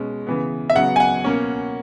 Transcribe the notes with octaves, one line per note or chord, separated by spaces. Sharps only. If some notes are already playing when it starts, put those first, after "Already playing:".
Already playing: B2 G#3 C#4
C#3 E3 B3
E5
C#3 F#3 B3 F#5
G#5
F#5
B2 A#3 C#4